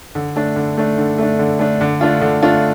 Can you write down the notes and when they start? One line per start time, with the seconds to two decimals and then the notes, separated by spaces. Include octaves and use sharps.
0.15 D3
0.36 A3 D4
0.56 D3
0.77 A3 D4
0.98 D3
1.18 A3 D4
1.39 D3
1.59 A3 D4
1.81 D3
2.01 A3 D4 F4
2.21 D3
2.42 A3 D4 F4